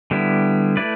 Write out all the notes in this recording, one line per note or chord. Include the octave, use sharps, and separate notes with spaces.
D3 G3 B3 E4
A3 E4 B4 D5